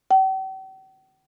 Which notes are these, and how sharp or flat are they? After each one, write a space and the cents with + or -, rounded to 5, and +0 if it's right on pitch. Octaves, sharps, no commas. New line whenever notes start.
G5 -45